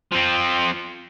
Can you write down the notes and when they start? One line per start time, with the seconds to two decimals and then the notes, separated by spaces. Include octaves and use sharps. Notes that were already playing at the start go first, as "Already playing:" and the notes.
0.12 F3 C4